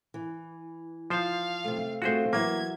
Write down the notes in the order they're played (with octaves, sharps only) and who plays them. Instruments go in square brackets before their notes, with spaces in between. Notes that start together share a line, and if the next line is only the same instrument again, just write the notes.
[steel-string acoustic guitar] E3
[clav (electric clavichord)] F3 C5 [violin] F5
[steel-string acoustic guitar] C3 A3
[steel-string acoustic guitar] A3 C4 F4 [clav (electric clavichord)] F#4 G#4 C5
[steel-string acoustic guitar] E3 F#3 E5 [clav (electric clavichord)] A#3 [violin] G#6